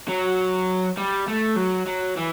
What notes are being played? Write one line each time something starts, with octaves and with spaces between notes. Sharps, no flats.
F#3
G3
A3
F#3
F#3
E3